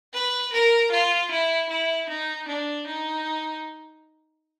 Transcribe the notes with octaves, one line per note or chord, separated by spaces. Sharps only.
B4
A#4
F4
E4
E4
D#4
D4
D#4